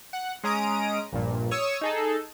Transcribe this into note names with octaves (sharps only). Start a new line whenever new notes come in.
F#5
G#3 C#4 A#5 D#6 D7
A#1 G2 A#2
C#5 C#6 D#6 E6
D#4 G#4 A4